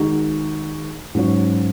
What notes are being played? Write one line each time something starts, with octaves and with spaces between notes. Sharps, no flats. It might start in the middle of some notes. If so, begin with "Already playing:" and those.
Already playing: D#3 G#3 D#4 F#4
G#2 F#3 C#4 F#4 C#5